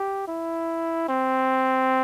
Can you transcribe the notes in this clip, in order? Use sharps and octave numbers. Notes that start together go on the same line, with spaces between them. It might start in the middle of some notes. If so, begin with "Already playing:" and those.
Already playing: G4
E4
C4